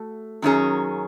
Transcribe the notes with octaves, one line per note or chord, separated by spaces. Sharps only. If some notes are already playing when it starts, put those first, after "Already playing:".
Already playing: A3 F#4
F#2 D#3 F#3 C#4 G#4